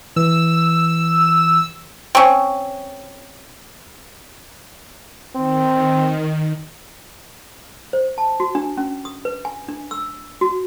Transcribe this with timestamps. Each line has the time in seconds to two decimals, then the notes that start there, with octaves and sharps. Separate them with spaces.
0.16 E3 E6
2.15 C4 C#4
5.36 D#3 C4
7.93 C5
8.18 A5
8.40 F#4
8.55 D4
8.77 C#4
9.05 D#6
9.25 B4
9.45 G#5
9.68 D4
9.91 E6
10.41 F#4